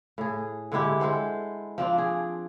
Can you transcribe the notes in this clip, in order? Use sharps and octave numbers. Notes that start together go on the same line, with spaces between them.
A2 G#4
D3 G#3 E4 G4
G#3 A4 C5 F#5
F3 C4 D4 F4
G#4